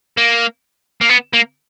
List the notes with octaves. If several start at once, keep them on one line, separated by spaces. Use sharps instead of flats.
A#3
A#3
B3
A#3